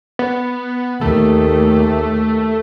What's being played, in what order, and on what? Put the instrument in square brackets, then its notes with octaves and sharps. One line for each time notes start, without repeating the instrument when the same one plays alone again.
[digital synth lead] B3
[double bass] D#2 [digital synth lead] A3